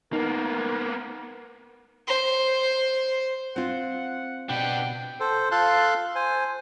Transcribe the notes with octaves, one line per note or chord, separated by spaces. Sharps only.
A#3 B3 D#4 A#4
C5
C4 F4 F#5
B2 D4 B4 G5
A4 C5
F4 A4 F5 A5 C6 F#6
C5 G#5